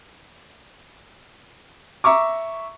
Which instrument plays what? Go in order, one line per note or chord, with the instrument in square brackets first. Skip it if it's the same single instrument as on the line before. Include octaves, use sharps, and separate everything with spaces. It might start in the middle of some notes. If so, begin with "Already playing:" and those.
[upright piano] E5 A#5 C#6 D6